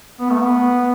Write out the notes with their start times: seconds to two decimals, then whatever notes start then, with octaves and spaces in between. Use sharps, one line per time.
0.20 B3
0.30 A3
0.40 B3